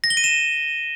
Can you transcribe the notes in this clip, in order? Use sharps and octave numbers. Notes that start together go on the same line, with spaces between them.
A#6
G7
D#7
E7